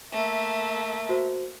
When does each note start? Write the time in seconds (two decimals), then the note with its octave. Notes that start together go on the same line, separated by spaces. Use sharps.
0.12 A3 A#3 E5
1.09 F#4 C5